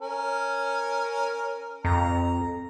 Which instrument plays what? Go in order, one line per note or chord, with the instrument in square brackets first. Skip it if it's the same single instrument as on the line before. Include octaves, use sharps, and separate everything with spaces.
[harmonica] C#4 A#4
[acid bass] F2 [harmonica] A#5